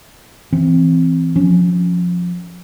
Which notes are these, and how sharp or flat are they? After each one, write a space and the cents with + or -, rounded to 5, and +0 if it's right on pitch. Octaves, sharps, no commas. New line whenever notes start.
E3 +0 C4 +0
F3 +20 C#4 +0